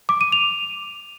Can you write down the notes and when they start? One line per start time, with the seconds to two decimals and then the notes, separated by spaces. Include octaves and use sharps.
0.09 D6
0.21 D#7
0.32 F7